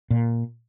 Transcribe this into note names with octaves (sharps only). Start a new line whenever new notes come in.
A#2